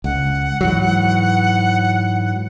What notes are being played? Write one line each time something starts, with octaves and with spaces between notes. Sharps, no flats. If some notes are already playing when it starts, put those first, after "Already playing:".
C#2 F#5
G#2 E3 F#3